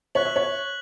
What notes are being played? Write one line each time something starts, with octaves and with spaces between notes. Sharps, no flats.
C#5 F#6 B6 F#7
E5
C#5